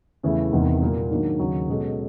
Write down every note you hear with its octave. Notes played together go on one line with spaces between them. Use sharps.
E2 C#3 E3 A3
E1 E2 C3 D#3
A#2 G3 A#3
G#2 D#3 F#3 A#3 D4
D#2 C#3 F#3
B2 G#3 C#4 F#4 A4